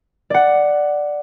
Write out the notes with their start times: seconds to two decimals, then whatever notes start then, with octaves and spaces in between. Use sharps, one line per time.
0.30 D5 F#5